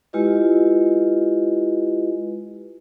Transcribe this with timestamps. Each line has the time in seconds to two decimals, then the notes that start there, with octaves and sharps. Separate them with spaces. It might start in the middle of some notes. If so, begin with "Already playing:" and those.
0.13 G#3 E4 F4 G4 B4 D#5